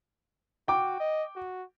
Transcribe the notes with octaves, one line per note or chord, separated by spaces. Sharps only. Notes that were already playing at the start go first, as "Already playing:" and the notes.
F#4 G5 D6
D#5
F#4